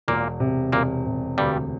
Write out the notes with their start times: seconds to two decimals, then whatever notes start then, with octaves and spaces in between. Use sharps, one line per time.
0.08 E1 A#2 A#3
0.40 C3
0.72 E1 A#2 A#3
1.06 C3
1.38 D2 G2 G3